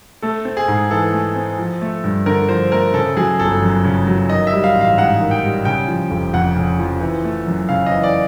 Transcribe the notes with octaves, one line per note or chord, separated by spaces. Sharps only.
A3 A4
C4
G#4
G#2
E3 A4
A3
C4
F3
A3
G2
D3 A#4
F3 C5
A3 A#4
C#3 A4
F#3 G#4
G1 A4
F#2
C#3
F#3
D#3 D#5
E5
G3
F5
A1
F5
G#2 F#5
D#3
G5
G3
C#3 G5
F3
F1
F2 F#5
C#3
F3
E3
A3
F#2
C#3 F5
D#5
E3
D5